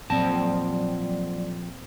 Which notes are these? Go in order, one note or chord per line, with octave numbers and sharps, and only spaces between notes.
F2 A#2 F#3 C4 D5 A5